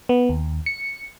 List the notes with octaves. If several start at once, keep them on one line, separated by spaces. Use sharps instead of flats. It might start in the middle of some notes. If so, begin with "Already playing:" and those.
B3
D#2
C#7